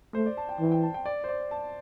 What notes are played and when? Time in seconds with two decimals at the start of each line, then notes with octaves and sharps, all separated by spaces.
0.14 A3 C5
0.26 D5
0.37 A5
0.49 G5
0.60 E3
0.72 G5
0.83 A5
0.94 G5
1.06 D5
1.24 C5
1.29 D5
1.51 A5